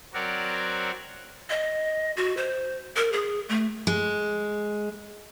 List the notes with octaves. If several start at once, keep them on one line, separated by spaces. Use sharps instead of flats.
F#3 C4 F#4 A#4 C#5 D5
D#5
F#4
C5
A#4
G#4
A3
G#3